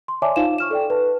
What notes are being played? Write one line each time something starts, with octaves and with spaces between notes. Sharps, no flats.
C6
C#5 D5 E5 G#5 A5 D6
D#4 F4 C5 F5 E7
C#6 F6 E7
A4 D5 G5
B4 A5